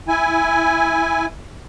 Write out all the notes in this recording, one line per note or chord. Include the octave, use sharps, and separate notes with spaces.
E4 G#5